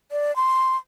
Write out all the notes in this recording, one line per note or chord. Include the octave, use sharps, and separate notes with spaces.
D5
C6